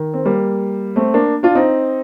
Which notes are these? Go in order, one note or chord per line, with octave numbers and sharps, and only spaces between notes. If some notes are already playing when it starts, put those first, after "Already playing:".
Already playing: D#3
C4
G3 A#3
A3 C4
A#3 D4
D4 F4
C4 D#4